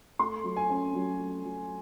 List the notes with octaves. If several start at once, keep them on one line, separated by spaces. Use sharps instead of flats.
A3 C6
F#3
G#5
C#4
F#3
A3
F#3